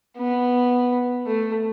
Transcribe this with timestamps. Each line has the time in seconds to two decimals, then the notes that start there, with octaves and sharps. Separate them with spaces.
0.18 B3
1.27 A3